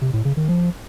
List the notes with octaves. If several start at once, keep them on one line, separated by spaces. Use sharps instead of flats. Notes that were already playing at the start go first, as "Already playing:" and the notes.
C3
A2
C#3
D#3
F3